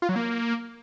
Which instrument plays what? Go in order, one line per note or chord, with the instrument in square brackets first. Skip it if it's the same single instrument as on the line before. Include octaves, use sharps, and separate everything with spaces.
[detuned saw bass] F4
F#3
A#3